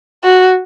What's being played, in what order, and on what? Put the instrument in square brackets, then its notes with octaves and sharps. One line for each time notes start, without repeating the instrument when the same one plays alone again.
[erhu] F#4